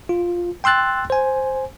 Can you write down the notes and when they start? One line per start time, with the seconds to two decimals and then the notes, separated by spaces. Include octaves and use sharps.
0.09 F4
0.64 G5 C6 E6 F#6 A6
1.10 C5 G#5